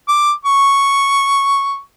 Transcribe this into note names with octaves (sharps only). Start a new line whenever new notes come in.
D6
C#6